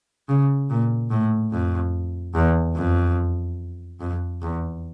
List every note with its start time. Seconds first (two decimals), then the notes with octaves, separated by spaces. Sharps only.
0.29 C#3
0.70 A#2
1.11 A2
1.52 F2
2.35 E2
2.76 F2
4.01 F2
4.42 E2